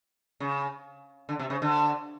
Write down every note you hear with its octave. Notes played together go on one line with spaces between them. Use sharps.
C#3
D3
C3
C#3
D3